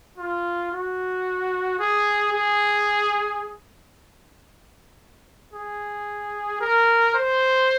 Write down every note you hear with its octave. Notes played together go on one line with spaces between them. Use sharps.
F4
F#4
G#4
G#4
G#4
A#4
C5